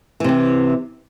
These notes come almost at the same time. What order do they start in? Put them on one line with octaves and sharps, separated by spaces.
E3 C3 C4